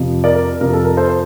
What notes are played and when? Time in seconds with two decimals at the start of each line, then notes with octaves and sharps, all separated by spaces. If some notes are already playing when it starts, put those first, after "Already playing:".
Already playing: F2 C3 F3
0.24 A#4 D5
0.36 A#4
0.61 F2 C3 F3 A#4
0.73 A4
0.84 A#4
0.97 A4 C5
1.08 C5